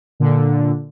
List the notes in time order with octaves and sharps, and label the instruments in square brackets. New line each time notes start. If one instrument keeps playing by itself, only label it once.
[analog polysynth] A#2 D3